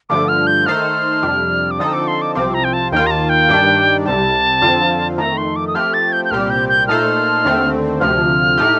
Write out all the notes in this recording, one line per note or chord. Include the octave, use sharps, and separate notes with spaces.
G2 D3 F3 A3 D6
F6
G6
D#3 A3 D#4 A4 C5 F6
F2 C3 G3 D4
D6
D3 F3 C4 D#4 A4 D#6
D6
C6
D6
C2 C3 F3 C4 D6
A#5
G5
A5
D#2 D#3 A#3 F4 G5
A#5
A5
G5
G2 D#3 G3 D4
C2 C3 G3 A5
F2 D3 F3 C4 F4
F2 D#3 A3 A#5
C6
D6
D#6
F3 A3 C4 G4 F6
A6
G6
G6
C2 A#2 G3 C4 G4 F6
G6
G6
A#2 A3 D#4 A4 C5 F6
D#2 D3 A3 C4
D2 C3 F3 F6
A2 A3 D#4 G4